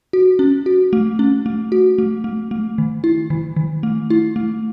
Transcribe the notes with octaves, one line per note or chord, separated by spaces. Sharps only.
F#4
C#4
F#4
A3
C#4
A3
F#4
A3
A3
A3
D#3
E4
D#3
D#3
A3
E4
A3